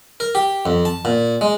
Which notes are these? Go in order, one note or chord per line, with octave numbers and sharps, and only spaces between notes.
A#4
G4
F2
A5
A#2
G#3